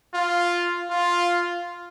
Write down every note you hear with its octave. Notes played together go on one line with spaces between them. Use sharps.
F4
F4